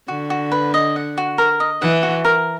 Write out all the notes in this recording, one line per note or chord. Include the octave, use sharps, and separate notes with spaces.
D3 F#4
F#4
B4
D#5
F#5
F#4
A#4
D#5
E3 F#5
F#4
A#4